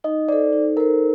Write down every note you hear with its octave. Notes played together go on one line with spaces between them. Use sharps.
D#4 D#5
A4 C5 D5
D#4
A4 A#4 C5